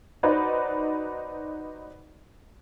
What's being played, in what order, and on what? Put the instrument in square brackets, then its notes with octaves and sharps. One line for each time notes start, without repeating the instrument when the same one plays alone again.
[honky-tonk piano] D#4 F#4 B4 C5 D5